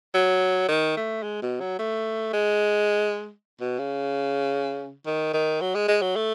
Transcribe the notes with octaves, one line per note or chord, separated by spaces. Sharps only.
F#3
D#3
A3
G#3
B2
F#3
A3
G#3
B2
C#3
D#3
D#3
F#3
G#3
G#3
F#3
A3